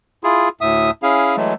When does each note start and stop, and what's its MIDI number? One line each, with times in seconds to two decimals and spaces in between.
0.24 0.49 64
0.24 0.49 65
0.24 0.49 68
0.61 0.91 38
0.61 0.91 45
0.61 0.91 76
0.61 0.91 87
1.03 1.36 61
1.03 1.36 64
1.03 1.36 68
1.03 1.36 77
1.36 1.54 52
1.36 1.54 54
1.36 1.54 56
1.36 1.54 57